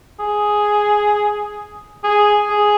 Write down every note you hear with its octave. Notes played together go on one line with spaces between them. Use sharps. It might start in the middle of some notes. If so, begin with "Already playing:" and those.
G#4
G#4
G#4